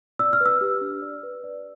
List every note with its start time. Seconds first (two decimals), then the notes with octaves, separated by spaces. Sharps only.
0.19 D5 E6
0.33 F6
0.41 B4
0.46 E6
0.61 G4
0.81 D4
1.02 D5
1.23 B4
1.44 D5